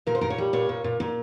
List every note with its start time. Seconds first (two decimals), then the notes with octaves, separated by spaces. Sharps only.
0.07 A#2 A#4
0.15 C5
0.21 A#2 A#4
0.30 C#5
0.38 G3
0.53 A#2 C#5
0.69 A#2
0.84 A#2
1.00 A#2